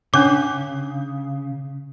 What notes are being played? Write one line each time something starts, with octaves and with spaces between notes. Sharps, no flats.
C#3 C#4 D4 C#5 D6